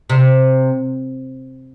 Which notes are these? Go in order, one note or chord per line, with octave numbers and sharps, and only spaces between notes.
C3